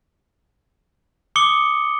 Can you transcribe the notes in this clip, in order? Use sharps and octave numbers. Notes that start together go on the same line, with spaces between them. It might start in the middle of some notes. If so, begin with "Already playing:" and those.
D6 D#6 C#7 G7